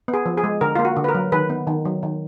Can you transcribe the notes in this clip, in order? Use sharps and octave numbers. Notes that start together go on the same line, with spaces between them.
B3
G#4
F3
G#4
G#3
D3 A#4
A#3 F4
F#4
D3
B4
A#4
F#3
D#3 B4
B3
D#3
F#3
D#3